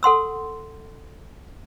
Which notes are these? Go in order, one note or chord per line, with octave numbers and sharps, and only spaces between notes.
A4 F#5 C6 E6